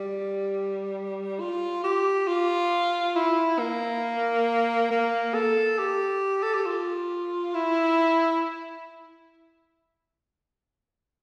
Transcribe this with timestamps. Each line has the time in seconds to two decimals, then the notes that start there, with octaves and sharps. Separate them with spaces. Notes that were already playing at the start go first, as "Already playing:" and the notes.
Already playing: G3
1.40 F4
1.84 G4
2.28 F4
3.15 E4
3.59 A#3
4.91 A#3
5.34 A4
5.78 G4
6.42 A4
6.54 G4
6.66 F4
7.54 E4